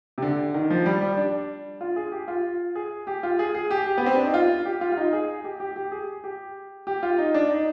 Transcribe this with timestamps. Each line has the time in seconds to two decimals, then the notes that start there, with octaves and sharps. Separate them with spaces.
0.18 C3
0.22 D3
0.54 D#3
0.70 F3
0.86 G3
1.02 G3
1.17 D4
1.81 F4
1.96 G#4
2.12 G4
2.28 F4
2.75 G#4
3.07 G4
3.23 F4
3.39 G#4
3.55 G#4
3.71 G4
3.86 G4
3.98 B3
4.06 C4
4.16 D4
4.25 D#4
4.34 F4
4.65 G4
4.81 F4
4.92 F4
4.97 D#4
5.13 G#4
5.44 G4
5.60 G4
5.76 G4
5.92 G#4
6.24 G4
6.87 G4
7.03 F4
7.18 D#4
7.34 D4
7.50 D#4